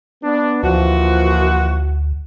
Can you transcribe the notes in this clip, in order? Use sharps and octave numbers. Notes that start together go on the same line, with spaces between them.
B3 D4
D2 A#2 E3 F3 F#4